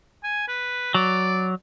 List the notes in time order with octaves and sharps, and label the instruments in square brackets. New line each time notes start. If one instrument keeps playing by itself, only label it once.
[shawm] G#5
B4
[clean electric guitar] F#3 [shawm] D5